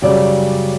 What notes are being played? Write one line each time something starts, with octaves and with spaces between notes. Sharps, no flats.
F#2 C#3 G3 D5